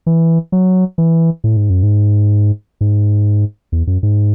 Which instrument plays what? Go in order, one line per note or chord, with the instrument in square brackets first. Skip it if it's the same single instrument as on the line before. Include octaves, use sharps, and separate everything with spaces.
[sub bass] E3
F#3
E3
A2
G#2
F#2
G#2
G#2
E2
F#2
G#2